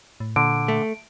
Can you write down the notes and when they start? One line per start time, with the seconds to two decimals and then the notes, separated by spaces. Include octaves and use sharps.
0.20 A2
0.36 A#2 D3 D7
0.68 A3